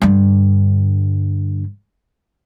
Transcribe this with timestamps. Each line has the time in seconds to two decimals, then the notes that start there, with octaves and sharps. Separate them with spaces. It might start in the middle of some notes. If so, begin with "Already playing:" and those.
0.02 G2 D3